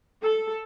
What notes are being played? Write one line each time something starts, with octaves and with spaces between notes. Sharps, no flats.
A4